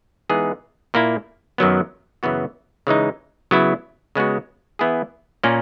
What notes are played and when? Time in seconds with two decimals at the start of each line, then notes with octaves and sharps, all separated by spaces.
0.30 E3 G#3 B3 D#4 G#4
0.94 A#2 A#3 E4
1.58 F#2 D#3 F#3 B3
2.23 F#2 C#3 E3 B3 F#4
2.87 C#3 E3 G#3 D#4
3.51 C#3 F#3 B3 E4
4.15 C#3 G#3 B3 F#4
4.79 E3 B3 E4 G#4
5.44 A#2 A#3 C#4